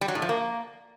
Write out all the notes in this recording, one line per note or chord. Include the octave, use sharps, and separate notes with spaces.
G3
F#3
A2
F3
A#3